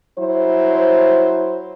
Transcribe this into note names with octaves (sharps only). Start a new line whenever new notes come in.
F#3 E4 C5